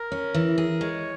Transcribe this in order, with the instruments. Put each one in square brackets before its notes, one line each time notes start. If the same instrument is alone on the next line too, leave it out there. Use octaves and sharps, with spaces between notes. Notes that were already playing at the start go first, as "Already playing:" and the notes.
Already playing: [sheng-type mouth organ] A#4
[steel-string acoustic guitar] C#4
E3
G#4
[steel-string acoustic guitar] G#3 [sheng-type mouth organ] C#5